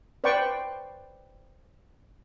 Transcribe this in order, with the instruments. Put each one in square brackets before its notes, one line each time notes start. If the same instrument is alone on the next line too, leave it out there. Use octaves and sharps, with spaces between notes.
[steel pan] B4 C5 D5 G5 C#6